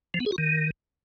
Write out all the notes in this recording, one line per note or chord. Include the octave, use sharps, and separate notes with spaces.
F3
B3
G#4
F#4
D#3